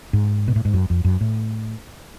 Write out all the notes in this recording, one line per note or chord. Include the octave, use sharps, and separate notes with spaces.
G#2
B2
A2
G#2
F#2
F2
F#2
A2